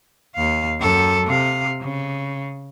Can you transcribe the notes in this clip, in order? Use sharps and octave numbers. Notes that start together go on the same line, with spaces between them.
D#2 F5
F#2 A4
C3 F5
C#3